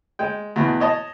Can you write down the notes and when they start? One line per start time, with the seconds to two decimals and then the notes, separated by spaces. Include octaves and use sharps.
0.19 G#3 G5
0.56 E2 B2
0.80 C#5 D#5 A5